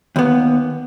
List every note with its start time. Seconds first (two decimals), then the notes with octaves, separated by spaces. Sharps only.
0.16 D#2 B3